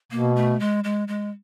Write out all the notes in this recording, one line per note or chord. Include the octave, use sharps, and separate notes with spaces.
B2 A#3
A3
G#3
G#3
G#3